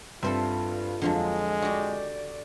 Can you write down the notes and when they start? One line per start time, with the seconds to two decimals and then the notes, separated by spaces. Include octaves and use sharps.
0.23 G2 C4 F4 A4 C5 E5
1.02 F2 D3 F3 F#3 G#3
1.62 F#4 G4 D5